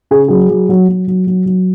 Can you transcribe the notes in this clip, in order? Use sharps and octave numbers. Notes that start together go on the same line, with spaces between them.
C#3 G#4
F#3 G#4
F#3
F#3
F#3
F#3
F#3
F#3